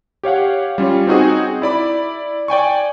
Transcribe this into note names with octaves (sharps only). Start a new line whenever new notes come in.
G4 C#5 F5 F#5
G3 C#4 F4
C4 D#4 F#4 G#4
E4 D5 B5 D6
D5 G5 G#5 C#6